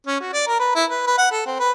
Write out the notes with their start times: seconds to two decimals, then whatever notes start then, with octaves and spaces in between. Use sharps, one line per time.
0.07 C#4
0.20 F#4
0.33 D5
0.47 A#4
0.59 B4
0.75 E4
0.89 B4
1.07 B4
1.18 F#5
1.31 A4
1.46 C4
1.59 B4